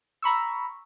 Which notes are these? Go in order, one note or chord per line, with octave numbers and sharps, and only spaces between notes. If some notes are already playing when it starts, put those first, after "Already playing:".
A#5 B5 C#6 E6